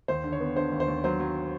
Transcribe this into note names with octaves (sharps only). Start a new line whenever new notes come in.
D#2 C5
D3
C#5
B3
D3 C5
D#2
C5
D#2
F#3 C5
F#3